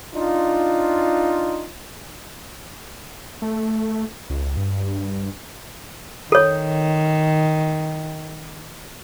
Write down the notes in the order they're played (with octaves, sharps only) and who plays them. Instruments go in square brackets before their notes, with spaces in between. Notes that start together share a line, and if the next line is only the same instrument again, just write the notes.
[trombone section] D4 D#4 F4
[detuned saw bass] A3
C#2
G2
[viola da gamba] D#3 [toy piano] A4 C#5